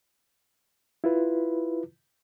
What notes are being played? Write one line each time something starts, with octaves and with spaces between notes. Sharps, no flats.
E4 F4 B4